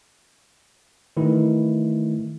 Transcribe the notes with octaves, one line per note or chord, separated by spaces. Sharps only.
D#3 E3 A3 E4